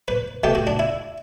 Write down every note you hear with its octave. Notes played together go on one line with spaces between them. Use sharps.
B4
B2 A3 G4
F#4
D4
E4